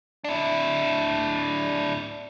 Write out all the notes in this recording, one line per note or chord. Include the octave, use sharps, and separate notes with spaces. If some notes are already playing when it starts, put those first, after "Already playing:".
D4 E4